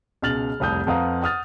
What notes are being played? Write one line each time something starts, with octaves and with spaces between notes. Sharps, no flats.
C#2 B2 F6 A6 F#7
F1 C2 D#6 G6
F2 B4 F5 F#5 A#5 D#6
F#5 D#6 F6 A6